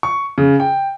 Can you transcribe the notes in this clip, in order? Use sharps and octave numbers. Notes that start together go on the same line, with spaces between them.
C#6
C#3
G5